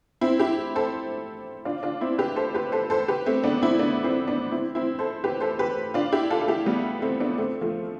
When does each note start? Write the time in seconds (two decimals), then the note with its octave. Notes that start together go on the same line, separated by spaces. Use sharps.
0.21 C4 E4
0.39 E4 G4
0.75 A4 C5
1.65 D4 F4
1.83 D4 F4
2.01 C4 E4
2.18 G4 B4
2.36 A4 C5
2.54 G4 B4
2.72 A4 C5
2.90 A4 C5
3.08 G4 B4
3.26 A3 C4
3.44 B3 D4
3.62 C4 E4
3.79 B3 D4
4.03 C4 E4
4.27 B3 D4
4.52 C4 E4
4.75 C4 E4
4.99 A4 C5
5.24 G4 B4
5.40 A4 C5
5.59 G4 B4
5.94 D4 F4
6.12 E4 G4
6.30 F4 A4
6.41 A4
6.48 E4 G4
6.66 G3 B3
7.02 A3 C4
7.20 B3 D4
7.38 A3 C4
7.61 F3 A3